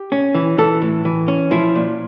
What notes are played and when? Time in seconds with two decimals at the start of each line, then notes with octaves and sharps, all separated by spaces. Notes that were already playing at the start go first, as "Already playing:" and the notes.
Already playing: G4
0.12 C#4
0.35 E3
0.58 E3 A4
0.82 A2
1.05 E3
1.28 C#4
1.51 F3 E4
1.75 A#2